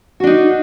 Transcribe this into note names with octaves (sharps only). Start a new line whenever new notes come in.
D4 D#4 F#4